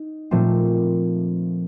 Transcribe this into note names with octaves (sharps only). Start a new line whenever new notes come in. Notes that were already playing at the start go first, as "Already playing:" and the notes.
Already playing: D#4
A#2 F3 A3 C4